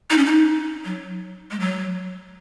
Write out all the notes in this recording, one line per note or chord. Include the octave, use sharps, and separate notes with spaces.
D#4
C#4
D#4
F#3
G#3
F#3